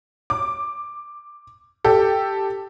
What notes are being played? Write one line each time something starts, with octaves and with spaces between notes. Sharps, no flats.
D6
G4 A4